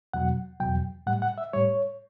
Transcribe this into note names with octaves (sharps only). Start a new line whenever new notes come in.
E2 B2 F#3 F#5
E2 B2 F#3 G5
A2 G3 F#5
F#5
E5
A2 G3 C#5